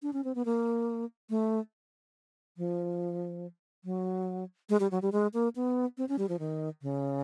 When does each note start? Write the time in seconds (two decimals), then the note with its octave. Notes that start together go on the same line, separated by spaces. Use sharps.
0.03 D4
0.13 C#4
0.24 C4
0.35 B3
0.45 A#3
1.30 A3
2.57 F3
3.84 F#3
4.69 G#3
4.80 G3
4.91 F#3
5.02 G3
5.12 G#3
5.34 A#3
5.56 B3
5.98 C4
6.09 C#4
6.19 G3
6.29 F3
6.39 D#3
6.82 C#3